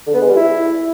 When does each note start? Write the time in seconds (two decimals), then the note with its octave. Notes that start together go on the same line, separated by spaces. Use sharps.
0.07 D3
0.14 B3
0.21 G#3
0.29 G3
0.36 E4